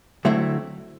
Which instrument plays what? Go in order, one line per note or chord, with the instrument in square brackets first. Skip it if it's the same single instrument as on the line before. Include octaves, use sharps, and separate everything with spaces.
[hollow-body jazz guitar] D3 F#3 A3 C4 E4 E5